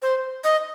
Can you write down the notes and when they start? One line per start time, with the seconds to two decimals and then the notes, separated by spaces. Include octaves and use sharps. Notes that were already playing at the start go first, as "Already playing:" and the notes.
0.02 C5
0.44 D#5